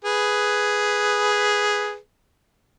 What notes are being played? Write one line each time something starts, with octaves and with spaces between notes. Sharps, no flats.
G#4 B4